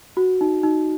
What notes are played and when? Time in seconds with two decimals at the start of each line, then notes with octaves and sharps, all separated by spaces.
0.17 F#4
0.41 D#4
0.63 D#4